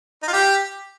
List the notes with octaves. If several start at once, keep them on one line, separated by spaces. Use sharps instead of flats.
D#4
F4
G4